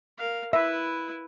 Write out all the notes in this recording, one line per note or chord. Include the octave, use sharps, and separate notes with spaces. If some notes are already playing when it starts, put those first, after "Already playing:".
A#4 F5
E4 B4 E5